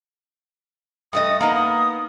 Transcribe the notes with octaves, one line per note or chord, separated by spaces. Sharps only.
G2 A3 D#5 D#6
A#3 B3 D#4 A#5
D#6